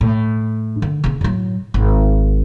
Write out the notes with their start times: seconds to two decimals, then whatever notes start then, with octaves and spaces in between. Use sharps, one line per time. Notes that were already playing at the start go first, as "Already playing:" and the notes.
0.01 A2
0.82 D3
1.04 C#3 C#4
1.21 A2 F#3
1.74 G#1